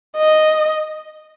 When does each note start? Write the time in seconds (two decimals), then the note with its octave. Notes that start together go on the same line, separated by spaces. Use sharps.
0.17 D#5